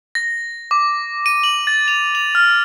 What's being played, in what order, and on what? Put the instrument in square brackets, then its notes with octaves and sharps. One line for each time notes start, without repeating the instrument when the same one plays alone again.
[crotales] A#6
D6
D#7
F#7
A6
F7
F7
F6